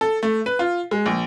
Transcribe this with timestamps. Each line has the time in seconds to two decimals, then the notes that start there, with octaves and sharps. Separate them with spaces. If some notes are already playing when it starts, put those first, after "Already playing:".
0.01 A4
0.23 A3
0.46 B4
0.59 F4
0.91 G#3
1.06 A#1